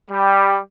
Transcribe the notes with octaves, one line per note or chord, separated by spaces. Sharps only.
G3